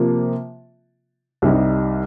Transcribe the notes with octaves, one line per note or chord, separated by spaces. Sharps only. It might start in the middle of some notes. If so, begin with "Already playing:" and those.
Already playing: C3 F3 A#3 F4
C2 C3 G3 D#4